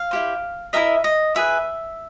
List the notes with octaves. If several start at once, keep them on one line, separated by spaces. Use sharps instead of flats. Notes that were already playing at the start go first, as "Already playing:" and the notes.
Already playing: F5
E4 G4 C5
E4 G4 A#4 D#5 E5
D#5
E4 G#4 B4 E5